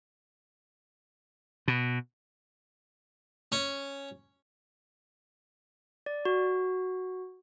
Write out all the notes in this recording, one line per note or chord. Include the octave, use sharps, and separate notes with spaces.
B2
C#4
D5
F#4